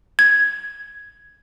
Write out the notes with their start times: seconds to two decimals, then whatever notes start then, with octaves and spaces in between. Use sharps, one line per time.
0.19 G#6